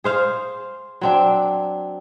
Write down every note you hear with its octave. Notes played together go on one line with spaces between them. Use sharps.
G#4 C5 F5
F#3 C4 D4